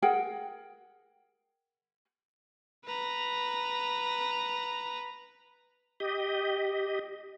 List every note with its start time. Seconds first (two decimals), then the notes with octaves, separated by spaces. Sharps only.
0.02 G#4 A#4 F#5 G5
2.85 B4 A#5
6.00 G4 D#5